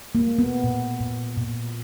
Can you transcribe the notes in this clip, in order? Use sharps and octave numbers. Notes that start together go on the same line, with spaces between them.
A#3
G#3
B3
A#2
A#2
A#2